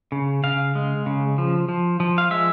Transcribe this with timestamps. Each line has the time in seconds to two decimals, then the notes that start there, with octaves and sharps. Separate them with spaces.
0.12 C#3
0.44 C#3 F5
0.75 G#3
1.06 C#3
1.38 F3
1.69 F3
2.00 F3
2.18 F5
2.31 G#3 E5